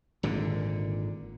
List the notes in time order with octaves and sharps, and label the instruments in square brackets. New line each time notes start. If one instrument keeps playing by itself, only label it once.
[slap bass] G#1 A#2 D3